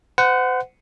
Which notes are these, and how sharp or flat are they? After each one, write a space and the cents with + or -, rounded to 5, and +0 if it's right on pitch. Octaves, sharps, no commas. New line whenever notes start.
C5 -40 F#5 +0